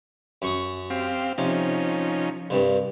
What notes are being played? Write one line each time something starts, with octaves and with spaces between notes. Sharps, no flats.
F#2 C#6 D#6
C4 G4 F5
C3 F3 C#4 D#4
C2 G2